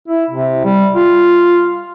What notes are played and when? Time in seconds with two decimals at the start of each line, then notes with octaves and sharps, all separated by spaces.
0.08 E4
0.30 C3
0.64 G3
0.95 F4